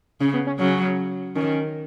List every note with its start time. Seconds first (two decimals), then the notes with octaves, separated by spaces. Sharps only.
0.21 C#3 C#4
0.34 B3
0.47 C#4
0.59 C#3 F#3 C#4
1.36 D#3 C#4